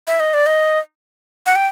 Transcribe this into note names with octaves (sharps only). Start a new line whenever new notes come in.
E5
D#5
D5
D#5
F#5
G5